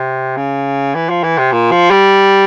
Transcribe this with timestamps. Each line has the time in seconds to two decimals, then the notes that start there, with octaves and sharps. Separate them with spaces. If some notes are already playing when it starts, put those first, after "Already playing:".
Already playing: C3
0.37 C#3
0.95 E3
1.09 F3
1.24 E3
1.38 C3
1.52 A#2
1.71 F3
1.91 G3